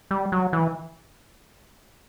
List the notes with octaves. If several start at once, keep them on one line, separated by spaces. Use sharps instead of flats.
G3
F#3
E3